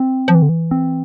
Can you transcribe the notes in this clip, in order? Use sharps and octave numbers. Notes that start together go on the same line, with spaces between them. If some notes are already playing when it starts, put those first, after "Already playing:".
Already playing: C4
F3
E3
D3
E3
C4